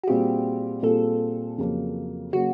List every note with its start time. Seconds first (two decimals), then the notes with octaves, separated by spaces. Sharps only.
0.03 F#4
0.08 A#2 G3 C4 F4 G4 G#4
0.83 A#2 G3 C4 F4 G#4 A4
1.58 F2 C#3 F#3 A#3
2.33 C#3 F#3 A#3 F#4